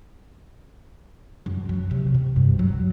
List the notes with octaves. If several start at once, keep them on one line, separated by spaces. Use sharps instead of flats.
F#2
F#3
C3
C3
G2
F#3